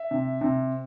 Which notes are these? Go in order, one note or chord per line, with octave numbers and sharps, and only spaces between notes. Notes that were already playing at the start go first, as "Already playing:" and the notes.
Already playing: E5
C3
C3